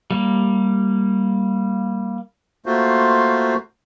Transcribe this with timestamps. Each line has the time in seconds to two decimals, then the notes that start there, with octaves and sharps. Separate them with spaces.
0.10 G3 A#3
2.66 A3 A#3 F4 F#4 C5